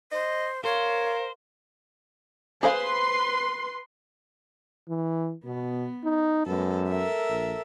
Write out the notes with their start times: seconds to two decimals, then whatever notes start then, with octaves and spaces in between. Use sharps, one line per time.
0.12 C5 D#5
0.65 A#4 C5 C#5 F5
2.63 G#4 B4 C5 F5 C6
4.89 E3
5.45 B2 B3
6.04 D#4
6.47 F#2 G#3 B3 A4
6.90 A4 A#4 E5
7.29 A#1